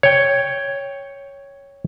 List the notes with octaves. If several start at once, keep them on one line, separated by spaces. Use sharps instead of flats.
C#5 G5